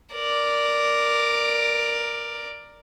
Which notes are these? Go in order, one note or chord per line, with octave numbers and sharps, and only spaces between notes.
A#4 D5